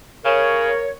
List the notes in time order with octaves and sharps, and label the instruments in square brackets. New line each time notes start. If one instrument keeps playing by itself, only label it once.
[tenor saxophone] C#3 [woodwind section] A#4 C#5